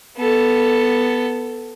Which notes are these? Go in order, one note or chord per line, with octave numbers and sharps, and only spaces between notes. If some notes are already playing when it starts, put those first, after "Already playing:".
B3 A4